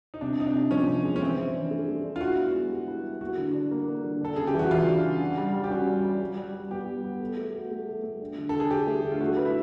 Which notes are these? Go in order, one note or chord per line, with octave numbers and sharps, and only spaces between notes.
D#4
C3 D4
C3 D#4
D4
C3
F3 C#4
C3
G#3
C#4
E3 C4
E3
D4
A3
A3
D4
F4
E4 F#4
B3
G#3
G4
E4
E4
A#3 F#4
D3
D4
A#3
A#3
D3
D4 A4
C#3 G#4
G4
E3
F#4
E3 F4
D4
C#3
F#4
G3
G3
G4
C#4 F#4
G3
G3
G3
G3
G3
B3 G4
G3
B3
A4
A3
F#4
A3
A4
A3
D4
D3
D3 A4
G#4
D4 G4
A3
D3
F4
A3 F#4
B4
E4